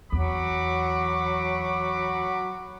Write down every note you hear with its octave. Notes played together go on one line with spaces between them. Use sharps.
E2 F#3 F#4 B5 D6